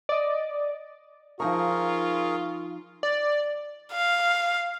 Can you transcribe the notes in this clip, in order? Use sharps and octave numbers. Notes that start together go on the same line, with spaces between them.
D5 D#5
F3 D#4 F4 G#4 A#4 A#5 C#6
D5
F5